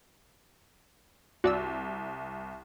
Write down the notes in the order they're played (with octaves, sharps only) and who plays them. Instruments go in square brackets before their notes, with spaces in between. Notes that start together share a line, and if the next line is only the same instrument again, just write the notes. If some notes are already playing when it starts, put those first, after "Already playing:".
[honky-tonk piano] C2 [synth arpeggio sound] F#4 D5 E6